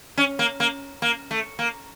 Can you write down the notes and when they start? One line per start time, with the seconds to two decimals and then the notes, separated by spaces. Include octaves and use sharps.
0.17 C#4
0.39 A#3
0.60 A#3
1.02 A#3
1.31 A3
1.59 A#3